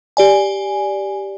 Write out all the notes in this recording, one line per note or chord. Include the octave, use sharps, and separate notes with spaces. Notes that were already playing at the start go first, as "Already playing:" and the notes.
G4 D5 G#5